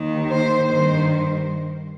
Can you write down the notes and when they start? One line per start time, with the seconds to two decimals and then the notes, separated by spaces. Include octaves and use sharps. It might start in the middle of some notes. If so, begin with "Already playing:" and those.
Already playing: D#2 D#3
0.31 C5
0.70 G2 D#3 C5